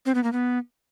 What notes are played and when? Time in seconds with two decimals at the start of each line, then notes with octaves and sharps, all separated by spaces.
0.06 C4
0.15 B3
0.24 A#3
0.32 B3